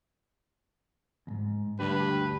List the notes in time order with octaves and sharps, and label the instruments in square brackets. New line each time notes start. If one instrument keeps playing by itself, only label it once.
[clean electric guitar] D#2 G#2
[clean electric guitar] D2 D4 G4 [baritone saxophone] G2 [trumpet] B4